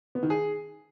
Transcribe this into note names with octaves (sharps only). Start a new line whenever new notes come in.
B3
D#3
G#4